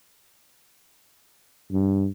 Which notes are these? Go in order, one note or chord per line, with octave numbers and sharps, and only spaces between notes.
G2